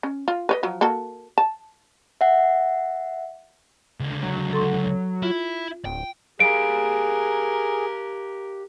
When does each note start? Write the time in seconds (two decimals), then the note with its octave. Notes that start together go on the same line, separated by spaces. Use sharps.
0.03 C#4
0.28 F4
0.49 B4 C#5 D#5
0.63 F3 F#3
0.81 A#3 F#4 A4
1.38 A5
2.21 E5 F#5
4.00 C#2 D3
4.23 F#3
4.53 A4 C6 C#6
5.22 E4 F4
5.85 D1 G5
6.40 G4 G#4 A#4 F5 D7